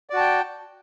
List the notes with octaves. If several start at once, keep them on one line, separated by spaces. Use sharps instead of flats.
F#4 D5 G5 A5